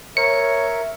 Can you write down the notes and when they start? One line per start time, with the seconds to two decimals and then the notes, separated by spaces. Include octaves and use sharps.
0.17 A#4 C#5 E5 C#7